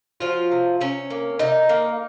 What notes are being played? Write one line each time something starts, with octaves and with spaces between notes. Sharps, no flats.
F3 F#3 F4
C3
C3 C#4
A#3
C3 D#4
A#3